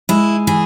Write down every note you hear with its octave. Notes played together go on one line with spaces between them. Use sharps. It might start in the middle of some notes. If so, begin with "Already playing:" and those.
G#3 E4
E3 G#4